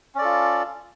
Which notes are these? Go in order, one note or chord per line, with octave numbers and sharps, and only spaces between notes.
C#4 F4 A4 D5